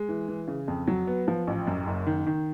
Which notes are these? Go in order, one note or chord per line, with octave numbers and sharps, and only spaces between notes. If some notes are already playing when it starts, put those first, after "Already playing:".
Already playing: G#3
E3
E3
C#3
F2
F#3
B3
F3
A1
F#2
F#1
D#3
D#3